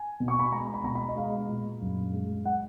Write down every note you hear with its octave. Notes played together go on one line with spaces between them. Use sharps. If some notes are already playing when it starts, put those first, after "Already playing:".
Already playing: G#5
B2
C#6
B5
G#3 A#5
B5
B2 A#5
B5
D#5
G#3 F5
A#2
F#2
G#3
F#5